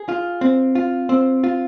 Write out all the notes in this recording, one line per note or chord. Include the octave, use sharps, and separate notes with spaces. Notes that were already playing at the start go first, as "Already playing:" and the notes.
Already playing: G#4
F4
C4
F4
C4
F4